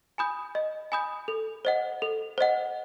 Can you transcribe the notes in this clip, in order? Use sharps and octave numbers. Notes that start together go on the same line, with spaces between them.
G#5 B5 D#6 G6
D#5
G#5 B5 D#6 G6
A4
C5 D#5 F#5
A4
C5 D#5 F#5